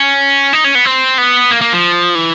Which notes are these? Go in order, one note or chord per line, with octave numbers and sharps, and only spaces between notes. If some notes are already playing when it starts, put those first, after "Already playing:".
Already playing: C#4
D#4
C#4
B3
C4
B3
A#3
A#3
F3
E3